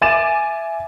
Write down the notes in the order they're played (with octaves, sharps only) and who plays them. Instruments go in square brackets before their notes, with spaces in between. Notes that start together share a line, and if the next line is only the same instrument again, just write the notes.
[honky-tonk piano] E5 G#5 D6 A6 D#7 E7